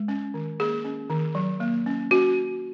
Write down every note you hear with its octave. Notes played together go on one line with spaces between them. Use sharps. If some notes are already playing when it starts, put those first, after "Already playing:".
Already playing: G#3
C#4
D#3
A#3 G#4
C#4
D#3
F#3
A#3
C#4
C#4 F#4